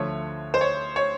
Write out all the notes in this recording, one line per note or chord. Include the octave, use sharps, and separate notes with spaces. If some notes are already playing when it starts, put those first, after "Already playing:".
Already playing: D2 D3 F3 A3 C#5
C5
C#5
C#5